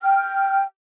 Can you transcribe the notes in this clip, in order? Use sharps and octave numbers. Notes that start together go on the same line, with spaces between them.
G5 F6